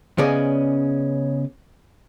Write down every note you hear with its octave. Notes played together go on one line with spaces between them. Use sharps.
C#3 B3 C#4 G#4 D5 D#5